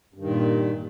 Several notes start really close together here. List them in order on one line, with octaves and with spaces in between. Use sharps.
G2 D#3 A#2